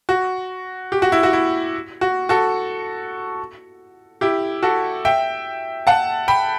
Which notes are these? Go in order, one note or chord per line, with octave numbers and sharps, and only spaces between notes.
F#4
G4
F#4
E4
F#4
E4
F#4
F#4 A4
E4 G4
F#4 A4
E5 G5
F#5 A5
G5 B5